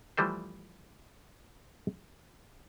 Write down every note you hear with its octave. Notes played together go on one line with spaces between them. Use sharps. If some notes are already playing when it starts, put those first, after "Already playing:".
E3 F3 G3 A3 C5